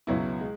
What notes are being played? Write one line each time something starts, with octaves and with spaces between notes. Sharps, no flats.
C#2 B2 F#3 B3 E4
G#3